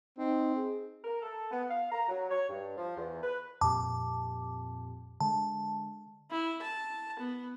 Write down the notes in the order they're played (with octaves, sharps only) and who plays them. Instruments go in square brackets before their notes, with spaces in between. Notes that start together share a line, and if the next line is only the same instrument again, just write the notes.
[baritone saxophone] C4 [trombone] D#4
[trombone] G#4
[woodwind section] A#4
A4
B3
F5
A#5
F#3
C#5
G2
F3
E2
B4
[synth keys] F2 A#2 G4 [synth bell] A5 D6
[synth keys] D3 G#3 [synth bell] A5
[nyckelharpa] E4
A5
B3